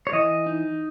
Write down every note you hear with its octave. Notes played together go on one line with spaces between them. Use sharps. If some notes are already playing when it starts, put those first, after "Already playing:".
C#5
E3 D#5
D#4